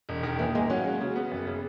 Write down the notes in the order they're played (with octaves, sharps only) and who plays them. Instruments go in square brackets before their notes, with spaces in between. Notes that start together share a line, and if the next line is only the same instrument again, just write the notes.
[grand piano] E1
D#3
[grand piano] A#2 [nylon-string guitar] E3
[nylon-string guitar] G#3 [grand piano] A#3
[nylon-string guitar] F#3 [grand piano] C#4
[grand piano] G#3
C#3
B3
F#1
C#3